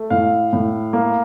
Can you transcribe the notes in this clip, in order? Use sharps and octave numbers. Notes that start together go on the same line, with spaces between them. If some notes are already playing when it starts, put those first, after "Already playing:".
Already playing: A3
A2 F5
A2
A#3